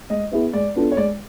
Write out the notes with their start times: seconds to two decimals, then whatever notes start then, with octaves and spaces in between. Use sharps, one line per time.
0.10 G#3 D#5
0.32 B3 E4 G#4 B4
0.53 G#3 D5
0.76 B3 D4 F4 A4
0.92 C#5
0.97 G#3 D5